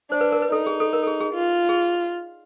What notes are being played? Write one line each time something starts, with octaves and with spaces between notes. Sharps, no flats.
D4 C5
B4
A#4
B4
D#4 A4
G#4
A4
A#4
A4
G#4
G#4
F4
G#4